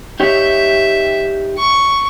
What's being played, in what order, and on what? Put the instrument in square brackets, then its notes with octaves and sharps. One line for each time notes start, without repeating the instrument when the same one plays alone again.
[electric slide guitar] D#4 G4 C#5 [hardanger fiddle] E5
[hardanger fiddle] C#6